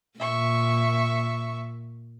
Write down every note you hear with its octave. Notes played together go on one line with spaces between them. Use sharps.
A#2 E5 C#6